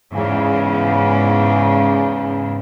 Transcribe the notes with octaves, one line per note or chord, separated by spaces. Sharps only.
E2 G#2 C#3